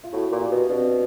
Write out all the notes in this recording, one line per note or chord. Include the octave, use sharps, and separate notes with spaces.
F4
A2 E4 F#4
A#2
F4 G4
B2
B2 C4 D4